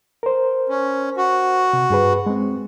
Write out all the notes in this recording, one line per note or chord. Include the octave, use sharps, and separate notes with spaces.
A#4 C5
C#4
F#4
C3
G2 G#4 B4
G#3 C4